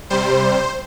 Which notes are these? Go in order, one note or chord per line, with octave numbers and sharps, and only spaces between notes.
C3 G3 C5